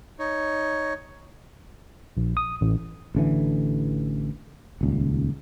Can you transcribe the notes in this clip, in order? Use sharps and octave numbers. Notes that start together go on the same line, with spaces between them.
D#4 C#5
A#1
D#6
A1
A1 D3 E3
D#1 C#2